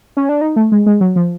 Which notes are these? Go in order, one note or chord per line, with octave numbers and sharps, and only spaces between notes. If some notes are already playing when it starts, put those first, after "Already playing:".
C#4
D4
D#4
A3
G#3
G#3
F#3
F3